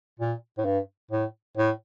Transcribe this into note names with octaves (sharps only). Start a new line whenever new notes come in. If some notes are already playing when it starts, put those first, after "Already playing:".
A#2
A2
G2
A2
A2